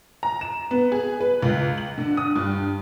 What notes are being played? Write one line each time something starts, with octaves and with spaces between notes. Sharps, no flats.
A#5
E7
B3
G#4
B4
C#2
F#7
D3
D#6
G2